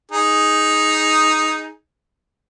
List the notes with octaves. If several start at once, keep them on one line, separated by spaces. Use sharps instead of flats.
D#4 G#4